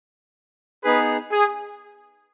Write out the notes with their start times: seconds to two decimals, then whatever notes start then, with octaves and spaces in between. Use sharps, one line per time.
0.84 B3 D#4 G#4 B4
1.32 G#4